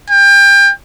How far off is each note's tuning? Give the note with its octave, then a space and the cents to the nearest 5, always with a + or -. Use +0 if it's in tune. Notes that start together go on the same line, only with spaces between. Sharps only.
G5 +30